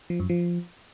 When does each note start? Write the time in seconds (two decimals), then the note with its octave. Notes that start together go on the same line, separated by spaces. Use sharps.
0.10 F3
0.20 F#2
0.30 F3